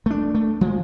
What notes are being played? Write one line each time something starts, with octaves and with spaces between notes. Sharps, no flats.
A3 D4
A3
F3 G#3